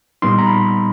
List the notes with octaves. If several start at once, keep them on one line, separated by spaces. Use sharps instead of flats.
A#2 G3 B3 D#4 C6
A#5
B5